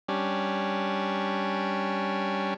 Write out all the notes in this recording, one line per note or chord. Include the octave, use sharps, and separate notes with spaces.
G3 C#4 D4